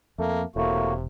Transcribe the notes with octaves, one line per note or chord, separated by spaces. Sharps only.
F2 A3 A#3
E1 A2 C3 A#3 F#4